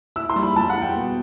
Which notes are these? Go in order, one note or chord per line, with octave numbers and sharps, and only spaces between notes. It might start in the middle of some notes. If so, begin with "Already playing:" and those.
E4 E6
C6
G3
B5
G3 A5
F#5
G3
G5
B2